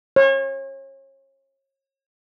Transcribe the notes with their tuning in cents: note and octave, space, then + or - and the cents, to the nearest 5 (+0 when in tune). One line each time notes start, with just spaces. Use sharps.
C#5 -35